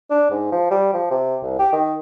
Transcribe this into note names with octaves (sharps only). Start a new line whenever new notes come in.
D4
G#2
F3
G3
F3
C3
C2
G4
D#3